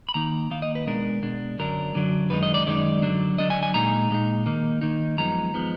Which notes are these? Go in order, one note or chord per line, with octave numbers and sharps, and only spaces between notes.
B5
D#3 A#3 D#4 A#5
D#3 A#3 D#4 F5
D#5
B4
B2 G#3 D4 A#4
B2 G#3 D4
F#2 D3 F#3 D4 A#4
F#2 D3 F#3 D4
F#2 D#3 G#3 D#4 B4
D#5
D5
F#2 D#3 G#3 D#4 D5
D3 F#3 D4
D3 F#3 D4 D#5
G#5
G#5
A#2 G#3 D#4 A#5
A#2 G#3 D#4
D#3 A#3 D#4
D#3 A#3 D#4
F#2 F3 G#3 B3 D#4 A#5
F3 G#3 B3 D#4